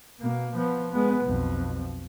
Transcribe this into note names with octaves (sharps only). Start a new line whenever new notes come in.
B2 A#3
F3 B3
G#3 B3
B1 F2